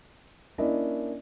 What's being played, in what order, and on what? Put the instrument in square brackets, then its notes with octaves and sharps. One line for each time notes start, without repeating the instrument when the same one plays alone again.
[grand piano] A#3 C#4 D4 E4 D5 D#5